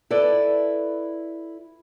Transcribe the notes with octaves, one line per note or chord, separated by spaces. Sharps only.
E4 A4 B4 D5